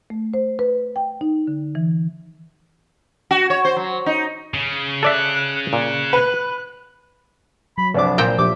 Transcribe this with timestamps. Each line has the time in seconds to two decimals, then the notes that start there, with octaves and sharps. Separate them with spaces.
0.10 A3
0.34 C5
0.59 B4
0.96 G5
1.21 D#4
1.47 D3
1.75 E3
3.31 F#4
3.50 C#5
3.65 C5
3.77 F#3
4.06 D#4
4.54 C#3
5.03 A4 D5 E5 F#6
5.73 A#2 F#6
6.13 B4
7.78 F#3 B5
7.94 C2 F3 D4 B4 D6
8.18 A#2 C5 G5 A#5
8.38 F3 D4 G4 E5 D6